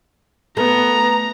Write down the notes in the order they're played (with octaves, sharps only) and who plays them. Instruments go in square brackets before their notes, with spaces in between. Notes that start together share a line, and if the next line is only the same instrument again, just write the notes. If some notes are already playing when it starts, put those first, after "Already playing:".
[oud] A3 [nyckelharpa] B3 [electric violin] A#5